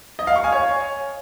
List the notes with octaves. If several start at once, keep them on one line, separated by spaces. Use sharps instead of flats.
D#5
F5
C#6
G#5
C#5